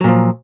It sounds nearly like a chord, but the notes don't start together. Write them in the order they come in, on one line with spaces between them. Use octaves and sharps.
F#3 A#2 F3